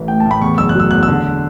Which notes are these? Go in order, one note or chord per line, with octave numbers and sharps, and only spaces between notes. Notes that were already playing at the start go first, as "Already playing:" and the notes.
Already playing: A1 E3
A2 G5
A5
A2
B5
E2 C#6
F#1 E6
F#6
F#3 E6
E2 F#6
E6
D3